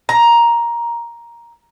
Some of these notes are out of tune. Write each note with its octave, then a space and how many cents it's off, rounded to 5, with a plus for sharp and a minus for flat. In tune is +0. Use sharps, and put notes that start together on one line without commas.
A#5 +10